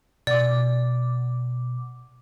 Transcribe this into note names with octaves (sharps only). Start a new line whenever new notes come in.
B2 D5 D6